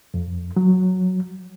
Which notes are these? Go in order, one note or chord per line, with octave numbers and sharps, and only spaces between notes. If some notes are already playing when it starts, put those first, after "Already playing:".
F2
F#3